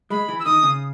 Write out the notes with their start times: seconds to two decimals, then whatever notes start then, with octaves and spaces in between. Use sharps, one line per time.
0.10 G#3 B5
0.28 E3
0.40 E6
0.45 D#3 D#6
0.63 C#3